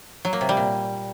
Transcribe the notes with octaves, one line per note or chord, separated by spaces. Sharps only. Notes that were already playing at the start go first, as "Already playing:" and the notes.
F#3
A#3
C3
G3
A#2